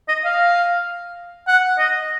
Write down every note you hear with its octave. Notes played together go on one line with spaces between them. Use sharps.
D#5
F5
F#5
D#5